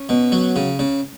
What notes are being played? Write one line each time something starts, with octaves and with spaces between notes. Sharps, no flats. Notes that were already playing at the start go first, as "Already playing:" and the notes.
Already playing: C#4
B2
F#3
C#3
C#3